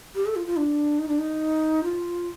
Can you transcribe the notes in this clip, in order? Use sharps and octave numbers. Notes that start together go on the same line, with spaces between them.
G4
A4
F4
F4
D4
D#4
D4
D#4
F4